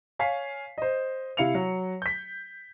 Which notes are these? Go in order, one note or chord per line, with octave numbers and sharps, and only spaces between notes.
C#5 F5 G#5 B6 C7
C5 D#5
C3 E4 F5 C#7 F7
F#3
G6 B6